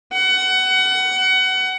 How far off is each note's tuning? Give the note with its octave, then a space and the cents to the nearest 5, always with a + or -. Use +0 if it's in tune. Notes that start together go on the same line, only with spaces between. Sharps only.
F#5 +25